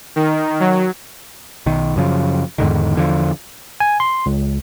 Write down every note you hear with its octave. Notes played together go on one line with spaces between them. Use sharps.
D#3
F#3
B1 D#3
F#2 C#3 F3
E2 G#2 D3 D#3
E2 D3 F3
G#5
C6
C#2